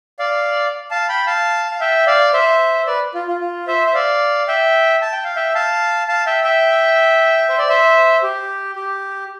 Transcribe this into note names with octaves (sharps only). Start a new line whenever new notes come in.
D5 F5
F5 A5
G5 B5
F5 A5
F5
E5 G5
D5 F5
C5 E5
B4 D5
F4
F4
F4
C5 E5
E5
D5 F5
E5 G5
A5
G5
F5
E5 G5
F5 A5
F5 A5
E5 G5
E5 G5
C5
D5
C5 E5
G4
G4